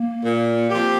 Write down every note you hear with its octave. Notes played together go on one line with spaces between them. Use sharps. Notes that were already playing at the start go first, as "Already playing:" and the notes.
Already playing: A#3
A#2
F3 C4 G4